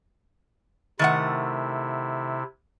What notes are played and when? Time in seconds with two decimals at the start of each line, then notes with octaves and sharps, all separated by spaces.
0.99 C3 D#3 A3 E4 F#5